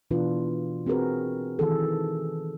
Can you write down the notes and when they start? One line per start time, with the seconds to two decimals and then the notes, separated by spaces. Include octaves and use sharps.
0.11 B2 E3 D4 F4 B4
0.86 C4 F#4 G#4 A#4 B4
1.59 D#3 E3 G#4 A4